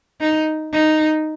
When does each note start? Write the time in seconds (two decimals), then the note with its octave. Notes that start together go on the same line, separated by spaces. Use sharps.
0.21 D#4
0.73 D#4